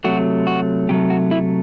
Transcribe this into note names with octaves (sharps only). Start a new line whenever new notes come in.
C3 F#3 A3 F#4
F#4
C3 F#3 A3 G4
F#4
E4